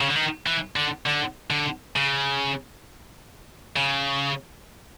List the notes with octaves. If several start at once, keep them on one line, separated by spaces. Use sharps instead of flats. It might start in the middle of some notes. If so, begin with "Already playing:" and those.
C#3
D3
D#3
E3
D3
D3
D3
C#3
C#3